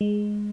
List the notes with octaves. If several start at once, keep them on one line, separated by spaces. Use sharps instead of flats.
G#3